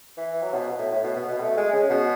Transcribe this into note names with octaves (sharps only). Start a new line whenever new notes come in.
E3
F#3
B2
A2
A2
B2
B2
B2
A3
G#3
C#3
B2